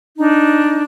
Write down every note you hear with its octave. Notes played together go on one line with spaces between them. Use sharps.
D4 D#4 A#5